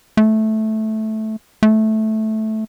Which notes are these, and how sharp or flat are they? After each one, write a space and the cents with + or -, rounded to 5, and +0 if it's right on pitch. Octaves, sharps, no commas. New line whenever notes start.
A3 -10
A3 -10